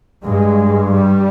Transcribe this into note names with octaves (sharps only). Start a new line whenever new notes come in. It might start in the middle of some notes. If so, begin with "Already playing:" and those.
G2 G#3
G3